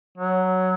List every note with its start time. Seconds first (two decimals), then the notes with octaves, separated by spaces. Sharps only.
0.18 F#3